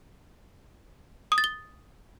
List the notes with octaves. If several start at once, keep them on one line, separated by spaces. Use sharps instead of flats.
D#6
A6
G7